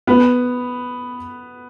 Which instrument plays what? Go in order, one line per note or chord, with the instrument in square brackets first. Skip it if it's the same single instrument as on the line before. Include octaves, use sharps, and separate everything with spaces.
[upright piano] B3 B4